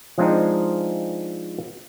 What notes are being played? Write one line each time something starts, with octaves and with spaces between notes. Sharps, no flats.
F3 G#3 C4 D4 D#4